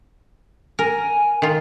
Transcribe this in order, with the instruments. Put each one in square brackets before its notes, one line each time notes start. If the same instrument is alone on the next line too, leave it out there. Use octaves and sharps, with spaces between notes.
[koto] A#4 [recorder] G#5
[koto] D#3 F4